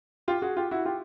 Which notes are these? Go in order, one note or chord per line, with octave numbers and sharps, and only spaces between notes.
F4 G4
F#4 G#4
F4 G4
E4 F#4
F4 G4